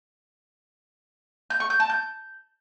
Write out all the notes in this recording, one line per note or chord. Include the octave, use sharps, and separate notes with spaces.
G6
C#6
G6
A5
G6